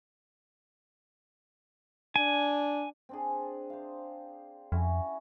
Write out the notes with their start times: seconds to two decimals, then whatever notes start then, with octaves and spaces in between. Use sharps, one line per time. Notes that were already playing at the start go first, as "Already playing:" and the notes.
2.16 D4 G#5
3.09 C4 D4 G#4
3.70 C5 F5
4.72 F2 C#4 E4 F#4